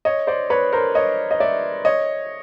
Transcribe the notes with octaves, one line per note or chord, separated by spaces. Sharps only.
C#5 D#5
C5 D5
B4 C#5
A#4 C5
C#5 D#5
D#5
D5 E5
C#5 D#5